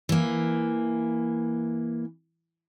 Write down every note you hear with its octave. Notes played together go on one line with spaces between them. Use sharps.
E3 A#3